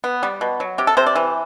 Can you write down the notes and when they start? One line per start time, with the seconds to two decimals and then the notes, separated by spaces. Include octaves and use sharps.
0.04 B3
0.23 G3
0.41 B2
0.60 F#3
0.78 C3 G4
0.87 A4
0.97 C3 C5
1.06 D5
1.16 E3